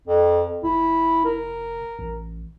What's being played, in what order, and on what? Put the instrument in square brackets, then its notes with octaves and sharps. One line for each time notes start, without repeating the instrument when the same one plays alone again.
[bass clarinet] F2
[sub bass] F1 [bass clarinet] E4
[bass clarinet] A#4
[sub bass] A1